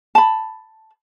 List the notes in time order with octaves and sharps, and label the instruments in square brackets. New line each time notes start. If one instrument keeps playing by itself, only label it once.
[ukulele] A5 B5